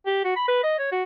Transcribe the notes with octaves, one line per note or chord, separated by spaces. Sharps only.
G4
F#4
B5
B4
D#5
C#5
F#4